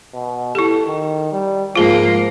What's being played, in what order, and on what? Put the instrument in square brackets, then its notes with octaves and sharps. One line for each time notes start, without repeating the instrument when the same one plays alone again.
[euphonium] B2
[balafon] E4 G4 [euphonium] A4
[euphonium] D#3
G3
[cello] G#2 A#3 [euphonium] F3 [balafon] F4 G#4